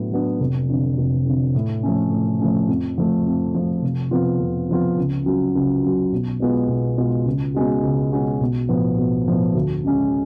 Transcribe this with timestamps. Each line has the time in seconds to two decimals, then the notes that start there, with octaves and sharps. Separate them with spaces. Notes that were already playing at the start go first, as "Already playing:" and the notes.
Already playing: A2 F#3 B3 D4
0.11 F#3 B3 D4
0.40 F1
0.69 F2 D3
0.98 F1
1.26 F2 D3
1.55 A2
1.83 F3 A3 C#4
2.12 A2
2.40 F3 A3 C#4
2.69 F2
2.98 F3 A3
3.26 F2
3.54 F3 A3
3.83 F1
4.11 F2 F3 B3 F4
4.40 F1
4.69 F2 F3 B3 F4
4.98 C#2
5.26 C#3 F#3
5.55 C#2
5.83 C#3 F#3
6.12 B1
6.40 B2 G#3 B3 F4
6.69 B1
6.97 B2 G#3 B3 F4
7.26 C#2
7.54 B2 G#3 C#4 F#4
7.83 C#2
8.12 B2 G#3 C#4 F#4
8.41 B1
8.69 A2 F3 B3
8.98 B1
9.27 A2 F3 B3
9.54 D2
9.84 C#3 G#3 C#4